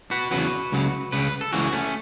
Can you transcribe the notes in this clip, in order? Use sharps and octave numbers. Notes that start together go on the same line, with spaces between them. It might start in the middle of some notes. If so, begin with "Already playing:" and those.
F#4 B4
E2 C#3 F#3 F#4 B4
C#2 C#3 F#3
C#2 C#3 B4
A4
C#2 C#3 E3 C#4 F#4
A3 C#4